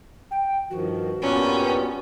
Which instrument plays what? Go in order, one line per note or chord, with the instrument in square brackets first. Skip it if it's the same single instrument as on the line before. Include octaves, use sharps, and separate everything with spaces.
[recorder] G5
[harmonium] G2 D#3 F3 [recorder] F#4
[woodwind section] G2 A#2 [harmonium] B3 [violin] C#4